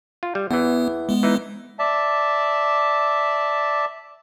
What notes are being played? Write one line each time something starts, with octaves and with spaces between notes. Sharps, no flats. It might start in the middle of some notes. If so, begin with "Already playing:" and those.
F4
G3
E2 E3 B3
G#3 B3
E3 D#4
D5 E5 A5